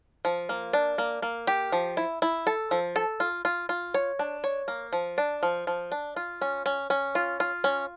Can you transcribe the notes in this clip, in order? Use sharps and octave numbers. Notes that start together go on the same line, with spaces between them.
F3
A#3
D4
A#3
A#3
G4
F3
E4
E4
A4
F3
A4
F4
F4
F4
C#5
D4
C#5
A#3
F3
D4
F3
F3
D4
F4
C#4
C#4
C#4
F4
F4
C#4